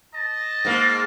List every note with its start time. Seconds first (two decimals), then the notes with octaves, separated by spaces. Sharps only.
0.14 D#5 A5
0.65 G#2 A#3